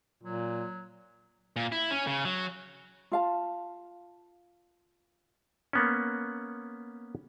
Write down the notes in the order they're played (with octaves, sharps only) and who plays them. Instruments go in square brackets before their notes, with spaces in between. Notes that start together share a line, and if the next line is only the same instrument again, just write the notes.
[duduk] A#2 [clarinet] F#3
[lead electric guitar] A#2
E4
C#4
C#3
F#3
[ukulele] F4 F5 A5
[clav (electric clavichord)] A#3 B3 C#4